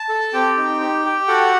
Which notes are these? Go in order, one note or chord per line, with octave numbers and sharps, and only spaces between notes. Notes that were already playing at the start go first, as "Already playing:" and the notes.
Already playing: A5
A4
C4 G4 G5
D#4
G4
G4
F#4 A4 F#5